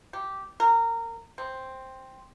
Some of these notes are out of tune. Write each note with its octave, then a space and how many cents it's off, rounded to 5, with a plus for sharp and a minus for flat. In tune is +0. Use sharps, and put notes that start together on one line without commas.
G4 -10
A#4 -20
C4 +5